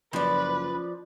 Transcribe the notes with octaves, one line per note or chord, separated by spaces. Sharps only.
F#1 F3 B4 D5